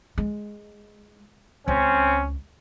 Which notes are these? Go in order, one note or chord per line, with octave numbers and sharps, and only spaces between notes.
G#3
C#2 C4 C#4